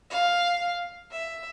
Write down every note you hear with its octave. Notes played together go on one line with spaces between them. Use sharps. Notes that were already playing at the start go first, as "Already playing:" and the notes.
F5
E5